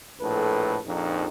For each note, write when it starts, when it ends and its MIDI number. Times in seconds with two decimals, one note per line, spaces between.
0.20 0.78 34
0.20 0.78 45
0.20 0.78 69
0.20 0.78 71
0.86 1.27 34
0.86 1.27 41
0.86 1.27 63